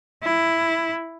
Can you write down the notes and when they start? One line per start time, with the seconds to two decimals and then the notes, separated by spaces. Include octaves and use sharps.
0.23 E4